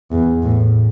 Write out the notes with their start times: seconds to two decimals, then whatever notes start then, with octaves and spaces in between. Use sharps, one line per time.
0.11 E2
0.43 A2